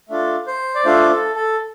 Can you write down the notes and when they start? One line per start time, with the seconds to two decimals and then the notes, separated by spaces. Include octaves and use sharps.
0.09 A3 D4 F4 A4
0.47 C5
0.75 D5
0.85 A3 D4 F4 A4 C5
1.10 A4
1.35 A4